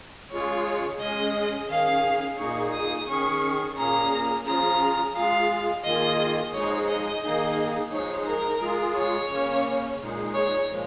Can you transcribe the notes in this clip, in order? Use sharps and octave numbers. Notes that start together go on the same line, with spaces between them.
C#3 G#3 F4 G#4 C#5
G#3 C#4 G#4 D#5
D#3 C#4 G#4 F5
A#2 A#3 D#4 G#4 C#6
D#6
D#3 C#4 G#4 C#6
A#2 A#3 C#4 G#4 A#5
F3 C#4 F4 G#4 A#5
G#3 F4 G#4 F5
D#3 A#3 F4 G#4 D#5
F3 G#3 D#4 G#4 C#5
D#5
D#3 A#3 D#4 G#4
F3 G#3 D#4 G#4 C#5
A#4
G#3 F4 G#4
C#5
C#3 A#3 C#4
A#2 G#3 D#4 G#4
C#5
A#2 F3 G#3